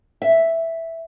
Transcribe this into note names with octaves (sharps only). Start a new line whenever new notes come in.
E5